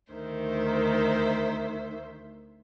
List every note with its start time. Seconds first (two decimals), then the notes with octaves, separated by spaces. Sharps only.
0.12 D2 D#3 C5 E5